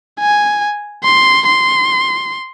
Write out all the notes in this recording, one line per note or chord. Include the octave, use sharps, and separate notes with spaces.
G#5
C6
C6